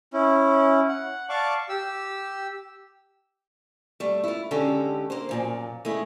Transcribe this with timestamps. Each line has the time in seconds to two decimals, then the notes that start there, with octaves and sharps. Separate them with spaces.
0.13 C#4 E4
0.88 F#5
1.29 D5 F5 A5 C#6 D6
1.69 G4 E6
4.00 G3 A3
4.24 E4 F4
4.51 D3 G#3 C#4 D#4 G4 A4
5.10 A#3 C5
5.29 F#2 A#2 F3
5.85 G#3 A3 E4